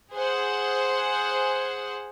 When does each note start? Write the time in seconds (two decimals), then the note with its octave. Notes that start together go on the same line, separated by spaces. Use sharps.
0.13 G#4 C5 F#5